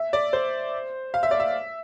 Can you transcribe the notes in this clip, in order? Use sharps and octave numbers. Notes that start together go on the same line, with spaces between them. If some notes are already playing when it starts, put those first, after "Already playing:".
Already playing: E5
D5
C5
F5
E5
D5
E5